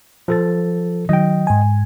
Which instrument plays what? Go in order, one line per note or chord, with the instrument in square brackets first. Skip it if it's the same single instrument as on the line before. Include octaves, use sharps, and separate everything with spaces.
[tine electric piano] F3 A4 A6
[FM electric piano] D#3 F#3 [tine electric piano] D#5 G5
[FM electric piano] G#2 G#5